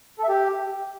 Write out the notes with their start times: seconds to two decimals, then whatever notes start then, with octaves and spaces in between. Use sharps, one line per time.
0.19 A4
0.24 E5
0.29 G4